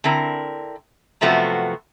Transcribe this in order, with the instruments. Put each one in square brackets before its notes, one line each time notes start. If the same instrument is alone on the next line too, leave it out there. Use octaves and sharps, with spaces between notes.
[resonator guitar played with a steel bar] D3 C4 E4 A#4
F#2 C3 F3 A3 B3 F#4